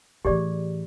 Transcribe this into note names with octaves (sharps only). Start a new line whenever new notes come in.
A2 E3 G4 G#4 D5